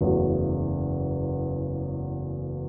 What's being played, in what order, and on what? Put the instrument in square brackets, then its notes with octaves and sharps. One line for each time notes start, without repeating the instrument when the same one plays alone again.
[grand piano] F#1 E2 C#3 F#3 A3